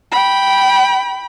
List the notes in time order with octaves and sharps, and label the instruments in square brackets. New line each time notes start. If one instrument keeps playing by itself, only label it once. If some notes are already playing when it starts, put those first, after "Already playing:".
[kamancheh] G5 B5